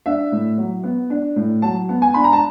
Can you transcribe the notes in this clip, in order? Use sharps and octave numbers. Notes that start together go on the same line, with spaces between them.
D4 E5
A2
F#3
B3
D4
A2
F#3 A5
B3
G#5
D4 B5
A#5
A5